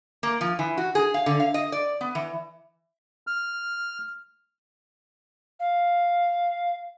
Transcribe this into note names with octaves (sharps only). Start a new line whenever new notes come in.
A#3
F3
E3
F#4
G#4
F5
D3
F5
D#5
D5
B3
E3
F6
F5